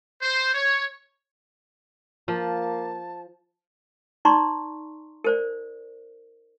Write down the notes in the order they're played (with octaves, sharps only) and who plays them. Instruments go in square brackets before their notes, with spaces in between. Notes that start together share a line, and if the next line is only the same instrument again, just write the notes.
[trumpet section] C5
C#5
[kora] F3 [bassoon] A#3 [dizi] A5
[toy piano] D#4 D5 A#5 C6 C#6
A#4 C5 D5